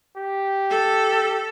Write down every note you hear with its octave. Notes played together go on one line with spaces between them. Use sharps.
G4
A4